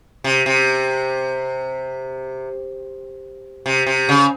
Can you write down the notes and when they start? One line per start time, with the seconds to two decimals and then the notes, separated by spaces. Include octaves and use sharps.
0.24 C3
0.46 C3
3.66 C3
3.86 C3
4.09 C#3